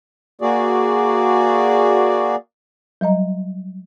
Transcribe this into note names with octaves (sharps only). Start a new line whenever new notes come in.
A#3 F#4 G#4 D5
F#3 G3 D#5 A#5